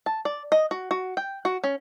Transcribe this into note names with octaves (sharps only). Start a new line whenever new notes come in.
A5
D5
D#5
F#4
F#4
G5
F#4
C#4